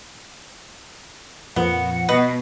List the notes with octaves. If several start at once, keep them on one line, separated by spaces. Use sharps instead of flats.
F2 A#2 F3 B3 F#5
B2 B4 D#5